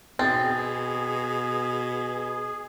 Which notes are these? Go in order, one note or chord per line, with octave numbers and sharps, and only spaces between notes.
B2 C4 G#4 A6